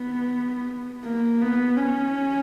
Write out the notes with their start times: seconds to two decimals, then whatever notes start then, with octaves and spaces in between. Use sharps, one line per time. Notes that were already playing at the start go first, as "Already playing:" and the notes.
Already playing: B3
1.05 A#3
1.41 B3
1.77 C#4